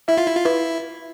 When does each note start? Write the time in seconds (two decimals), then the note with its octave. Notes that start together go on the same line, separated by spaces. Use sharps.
0.08 E4 E5
0.18 F4
0.27 E4
0.36 F4
0.45 E4 B4